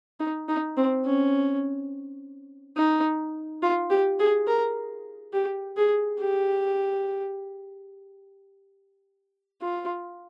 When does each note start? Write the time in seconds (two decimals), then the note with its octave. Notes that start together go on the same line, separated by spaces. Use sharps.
0.20 D#4
0.48 D#4
0.77 C4
1.05 C#4
2.76 D#4
3.63 F4
3.90 G4
4.19 G#4
4.47 A#4
5.33 G4
5.77 G#4
6.19 G4
9.61 F4